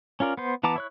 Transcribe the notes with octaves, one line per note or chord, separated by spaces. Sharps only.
C#4 F4 A#4 D5
B3 C5
E3 B3 A5 A#5 D6
E4 C#5 F#6